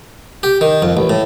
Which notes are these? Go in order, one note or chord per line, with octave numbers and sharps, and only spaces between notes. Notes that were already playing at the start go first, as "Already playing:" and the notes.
G4
D#3
F2
A1
A2